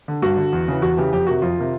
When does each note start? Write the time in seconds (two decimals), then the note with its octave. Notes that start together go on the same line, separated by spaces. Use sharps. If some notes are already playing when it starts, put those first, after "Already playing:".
0.08 D3
0.22 G2 F#4
0.37 D3
0.53 E2
0.68 C#3 E3
0.82 E2 F#4
0.97 C#3 E3 G4
1.12 F2 G4
1.27 C3 D#3 F#4
1.42 F2 F4
1.58 C3 D#3